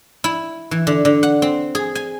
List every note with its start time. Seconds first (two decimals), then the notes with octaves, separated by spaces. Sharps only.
0.24 E4
0.71 E3
0.87 D3
1.05 D3
1.23 F#5
1.42 C4
1.75 G#4
1.95 G#5